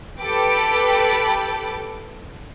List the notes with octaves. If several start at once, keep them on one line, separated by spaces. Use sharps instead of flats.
G4 A4 B4 G5 D6